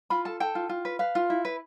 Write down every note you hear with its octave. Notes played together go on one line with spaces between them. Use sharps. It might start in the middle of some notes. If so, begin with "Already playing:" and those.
F4 B5
A4 A5
A4 G5
F4
F4
B4
B4 F5
F4
E4
B4